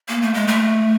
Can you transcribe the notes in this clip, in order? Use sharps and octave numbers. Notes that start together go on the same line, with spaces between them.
A#3
A3
G#3
A3